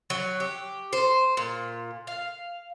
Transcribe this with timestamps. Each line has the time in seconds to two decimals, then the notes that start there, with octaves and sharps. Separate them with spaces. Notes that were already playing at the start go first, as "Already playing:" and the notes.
0.10 F#3
0.40 G4
0.93 C5
1.37 A#2
2.07 F5